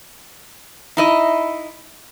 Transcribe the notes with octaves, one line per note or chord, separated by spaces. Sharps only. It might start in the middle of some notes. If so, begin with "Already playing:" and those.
D#4 E4 D#5